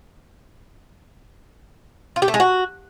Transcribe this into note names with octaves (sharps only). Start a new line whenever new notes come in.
F4
G4
A3
G#3
F#4